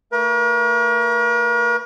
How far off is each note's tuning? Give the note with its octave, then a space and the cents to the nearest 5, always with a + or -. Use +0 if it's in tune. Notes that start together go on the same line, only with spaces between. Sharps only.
A3 +45 A#4 +45